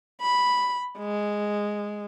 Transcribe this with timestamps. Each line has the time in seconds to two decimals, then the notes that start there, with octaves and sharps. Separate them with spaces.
0.22 B5
0.98 G#3